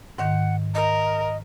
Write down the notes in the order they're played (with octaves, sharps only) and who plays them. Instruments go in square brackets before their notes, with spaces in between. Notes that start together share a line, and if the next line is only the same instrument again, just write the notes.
[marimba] G#2 D#3 G6 [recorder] F#5
[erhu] A#4 [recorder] D#5